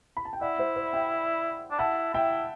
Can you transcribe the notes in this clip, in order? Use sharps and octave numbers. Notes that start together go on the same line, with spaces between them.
B5
A5
G5
E4 D5 F#5
C5 E5
C5 E5
E5 G5
D4
E4 F#5 A5
E4 E5 G5